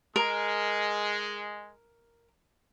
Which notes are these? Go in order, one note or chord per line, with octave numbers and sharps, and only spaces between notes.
G#3 A#4